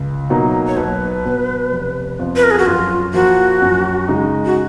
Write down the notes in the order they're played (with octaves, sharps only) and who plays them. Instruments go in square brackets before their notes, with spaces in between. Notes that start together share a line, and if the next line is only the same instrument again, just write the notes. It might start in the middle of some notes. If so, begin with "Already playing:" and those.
Already playing: [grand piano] C#2
B2 F#3 A#3 D#4
[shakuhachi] C#5
[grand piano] B1 [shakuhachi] B4
[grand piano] B2 F#3 B3
F1
F2 F3 B3
[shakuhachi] B4
A#4
G#4
F#4
[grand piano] F#2 [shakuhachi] F4
[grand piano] F3 A#3 [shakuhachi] F#4
[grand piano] F#2
C#3 G#3 D#4
[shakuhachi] F#4